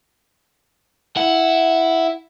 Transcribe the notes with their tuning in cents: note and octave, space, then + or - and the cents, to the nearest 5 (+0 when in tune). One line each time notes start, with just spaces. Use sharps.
E4 +0 F#5 +0